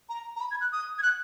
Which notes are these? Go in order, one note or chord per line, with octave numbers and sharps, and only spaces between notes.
A#5
A#5
B5
G#6
F#6
D#6
G#6
F#6